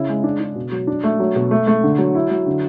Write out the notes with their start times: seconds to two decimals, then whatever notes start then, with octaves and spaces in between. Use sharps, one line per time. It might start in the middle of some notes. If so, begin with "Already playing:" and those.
Already playing: C#3 E4
0.09 G#3
0.24 D4
0.40 D4
0.56 B2
0.72 F#3
0.87 D4
1.04 A3
1.20 F#3
1.36 B2
1.51 A3
1.67 A3
1.84 D3
1.98 F#3
2.15 E4
2.30 F#3
2.47 D3